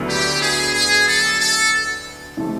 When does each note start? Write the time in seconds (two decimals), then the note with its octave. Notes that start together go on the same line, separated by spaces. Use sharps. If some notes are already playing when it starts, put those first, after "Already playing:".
Already playing: D2 D3 F#3 B3 E4
0.09 G4
0.42 G#4
0.74 G#4
1.08 A4
1.40 A4
2.37 C3 F3 A3